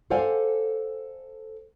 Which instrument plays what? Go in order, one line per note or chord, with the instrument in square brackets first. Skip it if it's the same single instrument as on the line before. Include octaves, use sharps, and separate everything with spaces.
[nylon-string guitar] A4 C5 D5 F5 F#5 G#5